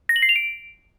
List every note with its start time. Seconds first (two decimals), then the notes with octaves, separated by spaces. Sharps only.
0.09 A#6
0.16 F#7
0.22 C7
0.29 F7
0.36 D7